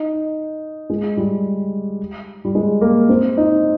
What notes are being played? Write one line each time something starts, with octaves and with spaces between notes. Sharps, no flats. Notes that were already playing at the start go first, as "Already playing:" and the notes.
Already playing: D#4
G#3
G3
G3
G#3
A#3
C4
D#4